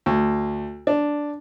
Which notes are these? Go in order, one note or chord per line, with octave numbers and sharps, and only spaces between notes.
D2
D4